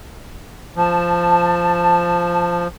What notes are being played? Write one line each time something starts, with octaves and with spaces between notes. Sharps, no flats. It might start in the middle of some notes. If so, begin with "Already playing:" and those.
F3 A5